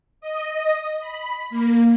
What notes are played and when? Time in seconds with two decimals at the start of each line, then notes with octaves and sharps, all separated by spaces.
0.21 D#5
1.00 B5
1.50 A#3